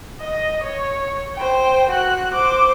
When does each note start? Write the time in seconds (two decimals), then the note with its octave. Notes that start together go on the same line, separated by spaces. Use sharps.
0.20 D#5
0.63 C#5
1.36 C5 G5
1.89 F#4 F#6
2.33 C5 D6